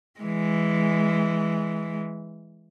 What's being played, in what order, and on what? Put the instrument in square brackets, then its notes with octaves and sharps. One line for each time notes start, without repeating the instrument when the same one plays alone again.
[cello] E3 G#3